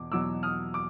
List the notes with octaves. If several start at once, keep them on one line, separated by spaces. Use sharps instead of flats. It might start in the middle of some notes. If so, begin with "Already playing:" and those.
Already playing: E2 B2 D6
E2 B2 F#3 D6 E6
D#6 F6
D6